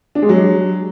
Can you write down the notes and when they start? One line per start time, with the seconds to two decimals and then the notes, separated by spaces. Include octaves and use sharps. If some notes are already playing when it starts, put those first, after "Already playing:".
0.15 D4
0.22 G#3
0.29 F#3